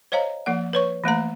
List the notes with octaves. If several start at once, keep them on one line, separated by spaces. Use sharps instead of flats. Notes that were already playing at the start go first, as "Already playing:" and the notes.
C5 C#5 D#5 F5 A#5
F3 A#3 F#5
B4 C#5 C#6
E3 A3 A#3 A#5